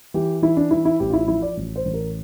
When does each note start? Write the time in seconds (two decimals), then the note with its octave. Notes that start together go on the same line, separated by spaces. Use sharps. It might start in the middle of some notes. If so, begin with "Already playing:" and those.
0.14 E3 G4
0.42 E3 E4
0.57 D4
0.71 E3 E4
0.85 E4
1.00 A1 G4
1.10 F4
1.13 E4
1.27 F3 E4
1.42 D5
1.57 A1
1.76 C5
1.85 A1
1.94 A#4